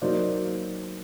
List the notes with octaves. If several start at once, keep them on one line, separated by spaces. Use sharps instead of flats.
F#3 A#3 D#4 C5 D5